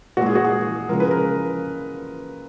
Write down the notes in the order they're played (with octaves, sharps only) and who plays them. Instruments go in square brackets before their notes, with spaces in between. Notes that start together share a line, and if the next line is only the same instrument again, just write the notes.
[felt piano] A#2 G#3 F#4
G#4
F#4
G#4
C#3 F3 G#3 A#4
B4
A#4